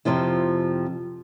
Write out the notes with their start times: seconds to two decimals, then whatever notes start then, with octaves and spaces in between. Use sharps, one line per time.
0.05 F2 C3 F3 C4 E4